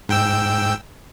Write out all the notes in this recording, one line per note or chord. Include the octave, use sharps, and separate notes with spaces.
G#2 G5 E6